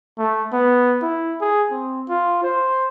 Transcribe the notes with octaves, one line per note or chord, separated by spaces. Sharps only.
A3
B3
E4
G#4
C4
F4
C5